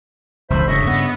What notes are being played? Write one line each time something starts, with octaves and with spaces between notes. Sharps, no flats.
E1 C#2 G2 C5 E5 B5
E1 G2 C#3 D#5 E5 C#6
B3